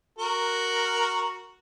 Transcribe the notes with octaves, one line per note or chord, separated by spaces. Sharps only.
F#4 A#4